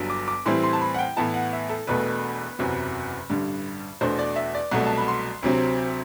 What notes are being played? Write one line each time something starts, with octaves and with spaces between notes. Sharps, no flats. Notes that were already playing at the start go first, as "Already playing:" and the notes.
Already playing: G1 G2 F#3
D6
D6
A2 E3 G3 C4 E4 C6
C6
A5
B5
F#5
G5
A2 E3 B3 E4 A5
F#5
E5
A4
E1 E2 B2 A3 B4
F#1 E2 C3 F#3
A1 G2 D3 G3
E2 B2 A3 D4 C5
D5
E5
D5
C2 B2 F#3 A3 F#5
A5
B5
C6
D2 C3 F#3 C4